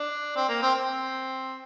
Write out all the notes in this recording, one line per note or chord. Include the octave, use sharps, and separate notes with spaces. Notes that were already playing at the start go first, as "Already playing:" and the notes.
Already playing: D4
C4
A#3
C4
C4